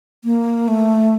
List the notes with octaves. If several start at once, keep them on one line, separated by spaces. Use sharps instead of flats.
A#3
A3